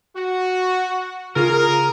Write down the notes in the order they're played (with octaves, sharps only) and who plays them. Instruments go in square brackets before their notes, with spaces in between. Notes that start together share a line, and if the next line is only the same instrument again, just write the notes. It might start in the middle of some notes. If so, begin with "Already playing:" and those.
[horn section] F#4
[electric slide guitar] C#3 F4 G#4 [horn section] A#4